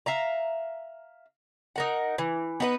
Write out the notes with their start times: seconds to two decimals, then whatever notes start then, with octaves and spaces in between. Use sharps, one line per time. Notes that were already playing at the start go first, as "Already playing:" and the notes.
0.06 E5 F5 A#5
1.76 D#4 A#4 F#5
2.18 E3
2.60 B3 D#4 G#4 B4